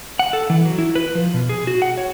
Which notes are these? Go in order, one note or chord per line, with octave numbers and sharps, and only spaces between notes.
F#5
A4
E3
F#3
E4
B4
F3
B2
G#4
F#4
F#5
C#5